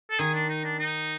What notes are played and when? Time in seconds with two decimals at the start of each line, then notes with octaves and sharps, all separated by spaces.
0.10 A4
0.19 D#3 G#4
0.34 D4
0.49 D#4
0.64 D4
0.79 D#4